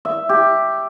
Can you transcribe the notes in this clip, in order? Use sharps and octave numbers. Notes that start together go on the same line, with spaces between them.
E5
G4